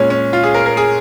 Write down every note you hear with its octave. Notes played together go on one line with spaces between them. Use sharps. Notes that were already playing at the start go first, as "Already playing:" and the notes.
Already playing: A#2 G#3 C#4
C#4
F4
G#4
A#4
A#4
G#4